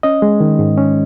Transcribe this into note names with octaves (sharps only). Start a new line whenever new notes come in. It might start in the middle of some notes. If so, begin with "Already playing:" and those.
C#4 D#5
G#3
D#3
G#2
C#4